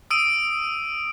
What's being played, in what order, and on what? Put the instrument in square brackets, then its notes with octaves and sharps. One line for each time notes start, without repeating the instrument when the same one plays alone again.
[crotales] D#6 E6 D7 D#7